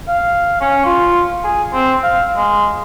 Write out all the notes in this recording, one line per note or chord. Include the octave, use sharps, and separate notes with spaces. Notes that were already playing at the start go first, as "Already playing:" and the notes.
F5
C#4
F4
G#4
C4
F5
G#3